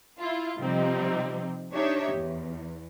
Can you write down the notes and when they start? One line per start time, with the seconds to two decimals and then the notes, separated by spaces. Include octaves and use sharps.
0.20 E4 F4
0.58 C3 F3 G3 C4 D#4
1.73 D4 D#4 G4 C#5 E5
2.14 E2